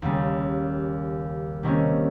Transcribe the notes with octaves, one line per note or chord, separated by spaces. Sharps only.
D#2 C#3 G3
C3 D#3 G3 A#3 C#4